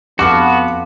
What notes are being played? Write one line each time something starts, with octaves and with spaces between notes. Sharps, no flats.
F2 B3 F4 F#4 A5 D6